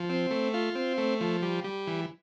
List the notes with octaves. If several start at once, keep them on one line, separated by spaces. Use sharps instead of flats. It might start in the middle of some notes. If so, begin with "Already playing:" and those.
Already playing: F3
C4
A3
F4
C4
A3
F3
G3
G3
E3